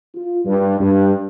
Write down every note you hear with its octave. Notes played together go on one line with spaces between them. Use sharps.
F4
G2
G2